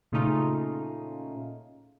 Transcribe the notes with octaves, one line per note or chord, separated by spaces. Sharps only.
A#2 C#3 A3 C#4 D#4 F4